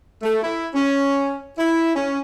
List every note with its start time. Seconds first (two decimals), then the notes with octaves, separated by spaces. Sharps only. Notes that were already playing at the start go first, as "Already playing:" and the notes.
0.23 A3
0.42 E4
0.73 C#4
1.58 E4
1.95 C#4